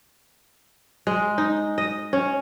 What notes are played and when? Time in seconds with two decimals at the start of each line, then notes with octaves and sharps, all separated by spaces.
1.07 G#3
1.38 D#4
1.78 D#5
2.13 C#4